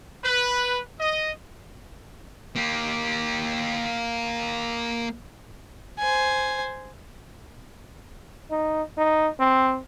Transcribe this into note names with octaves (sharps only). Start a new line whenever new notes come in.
B4
D#5
A#3 G4
C5 G#5
D#4
D#4
C4